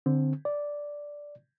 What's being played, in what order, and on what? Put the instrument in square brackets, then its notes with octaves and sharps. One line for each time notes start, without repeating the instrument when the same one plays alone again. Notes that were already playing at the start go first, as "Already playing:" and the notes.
[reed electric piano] D3 C4
D5